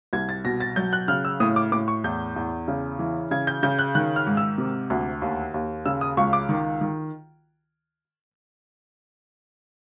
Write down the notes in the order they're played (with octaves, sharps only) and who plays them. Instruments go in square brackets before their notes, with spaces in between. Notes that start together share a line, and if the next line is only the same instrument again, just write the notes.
[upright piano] C2 G#6
A6
B2 A#6
A6
F#3 G6
F#6
C#3 F6
E6
A2 D#6
D6
A2 D6
C#6
E2 G6
E2
C#3
E3
C#3 G#6
G6
C#3 G6
F#6
D#3 F#6
F6
G#2
E6
C3
D2
D#2
D#2
C#3 E6
D#6
C#2 C#6
D6
D#3
D#3